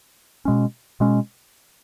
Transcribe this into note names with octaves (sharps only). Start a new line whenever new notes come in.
B2 G#3 C#4
B2 G#3 C#4